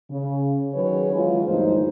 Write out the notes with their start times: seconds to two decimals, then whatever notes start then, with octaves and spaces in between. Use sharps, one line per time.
0.11 C#3
0.74 D#3 F#3 C#4 G#4 B4 C#5
1.14 D#3 E3 F#3 G#3 F4
1.47 D2 G2 G#3 A#3 D#4 C5